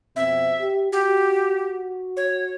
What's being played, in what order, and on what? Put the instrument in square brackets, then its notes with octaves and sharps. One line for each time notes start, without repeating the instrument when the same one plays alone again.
[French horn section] F2 B2 C4 [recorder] E5
[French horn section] G4
[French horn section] F#4 [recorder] G4
[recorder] C#5